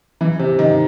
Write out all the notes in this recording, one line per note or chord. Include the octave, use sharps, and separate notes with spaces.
E3
C3
D#3